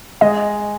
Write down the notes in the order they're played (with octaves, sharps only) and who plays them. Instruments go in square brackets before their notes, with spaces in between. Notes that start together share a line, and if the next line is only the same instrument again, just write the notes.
[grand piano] G#3 [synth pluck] D#5